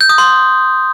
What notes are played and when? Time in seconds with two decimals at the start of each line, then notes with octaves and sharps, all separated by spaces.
0.01 G6
0.09 D#6
0.18 C6